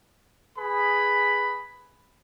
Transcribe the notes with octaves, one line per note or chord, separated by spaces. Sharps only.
G#4 B4 B5